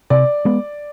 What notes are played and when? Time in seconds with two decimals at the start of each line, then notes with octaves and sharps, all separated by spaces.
0.10 C3 D5
0.45 G#3 B3